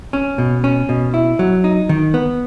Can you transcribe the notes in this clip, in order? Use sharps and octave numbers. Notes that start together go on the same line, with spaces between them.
C#4
B2
C#4
B2
E4
F#3
D#4
D#3
B3